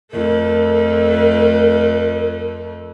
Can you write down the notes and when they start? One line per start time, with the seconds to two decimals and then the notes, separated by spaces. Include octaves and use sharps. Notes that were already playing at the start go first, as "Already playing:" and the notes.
0.12 F2 A3 A#4